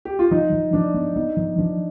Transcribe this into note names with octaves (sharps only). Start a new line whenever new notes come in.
G4
F4
F3 D#4
F3
F3 D4
B3
B3 D#4
F3
F3 D4